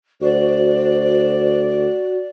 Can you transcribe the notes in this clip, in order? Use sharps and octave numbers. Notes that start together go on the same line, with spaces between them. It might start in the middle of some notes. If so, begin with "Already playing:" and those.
D2 F#4 C5 D5